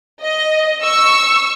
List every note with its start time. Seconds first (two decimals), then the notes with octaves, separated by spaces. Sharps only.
0.22 D#5
0.83 C#6 E6